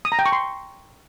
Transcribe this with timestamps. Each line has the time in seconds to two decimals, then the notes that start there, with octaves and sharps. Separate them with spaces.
0.05 D#6
0.12 A#5
0.19 G5
0.26 C#6
0.32 C6